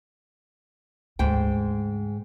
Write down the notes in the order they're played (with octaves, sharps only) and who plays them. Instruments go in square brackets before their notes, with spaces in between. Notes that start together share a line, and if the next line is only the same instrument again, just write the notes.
[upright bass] D2 C#3 [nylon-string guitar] G#2 G5